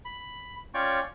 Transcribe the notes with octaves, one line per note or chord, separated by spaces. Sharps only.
B5
C#4 F4 C#5 D5 G5 C#6